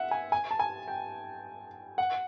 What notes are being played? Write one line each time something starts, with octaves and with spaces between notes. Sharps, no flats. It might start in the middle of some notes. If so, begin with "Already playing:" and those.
Already playing: E5 F#5
G#5
G#5
A5
G#5
G5
F#5